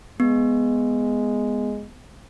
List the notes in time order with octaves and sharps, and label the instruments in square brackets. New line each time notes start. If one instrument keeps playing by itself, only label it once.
[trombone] G#3 [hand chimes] B3